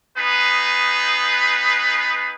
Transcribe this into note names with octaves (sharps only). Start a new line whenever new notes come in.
B3 D#4 G#4 B4